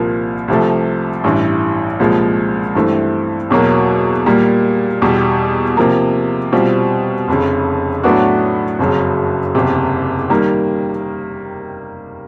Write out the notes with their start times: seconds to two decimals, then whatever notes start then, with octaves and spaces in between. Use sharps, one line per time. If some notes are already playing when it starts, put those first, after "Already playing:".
Already playing: C2 A#2 F3 A#3
0.48 C2 C3 F3 A3
1.24 A1 G2 E3
1.99 C2 A#2 F3 G#3
2.75 G2 E3 A3 C4
3.50 E2 B2 F#3 A#3
4.26 A#2 G3 A#3
5.02 E2 B2 G3
5.77 C3 F3 A#3
6.53 B2 G3 C4 F4
7.28 F1 F2 C#3
8.03 A2 F#3 B3 D4 F#4
8.79 F#1 F2 C#3 F#3
9.55 F#1 E2 C3
10.30 D#3 G3 A#3